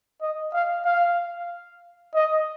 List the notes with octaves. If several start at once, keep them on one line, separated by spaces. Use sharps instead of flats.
D#5
F5
F5
D#5